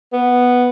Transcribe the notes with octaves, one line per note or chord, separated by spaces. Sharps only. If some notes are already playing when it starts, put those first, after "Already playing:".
B3